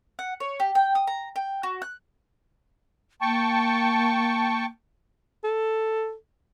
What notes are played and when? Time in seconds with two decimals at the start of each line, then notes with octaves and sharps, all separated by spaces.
0.19 F#5
0.40 C#5
0.60 G4
0.75 G5
0.95 D#6
1.07 A#5
1.36 G5
1.63 F#4
1.82 F#6
3.21 A#3 G5 A5 C#6
5.44 A4